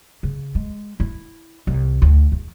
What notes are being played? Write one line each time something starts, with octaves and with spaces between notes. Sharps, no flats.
C#3
G#3
E4
C2
D2
E2